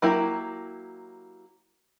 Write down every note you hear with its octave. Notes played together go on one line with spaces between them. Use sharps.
F#3 A#3 E4 G4